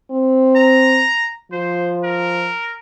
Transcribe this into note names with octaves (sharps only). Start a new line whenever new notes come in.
C4
A#5
F3 C5
A#4